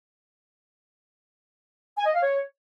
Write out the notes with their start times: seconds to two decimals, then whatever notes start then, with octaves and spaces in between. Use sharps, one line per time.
1.98 G#5
2.06 D#5
2.14 F5
2.22 C#5